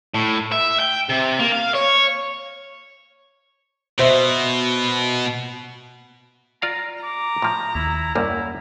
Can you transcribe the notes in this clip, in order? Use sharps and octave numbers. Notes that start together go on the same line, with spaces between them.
A2
E5
G5
C3
A#3
F5
C#5
B2 C5 E5
F4 D5 F5 A#5
A#5 D6
A2 F3
D#2 E4
C2 F#2 G3 A#3 E4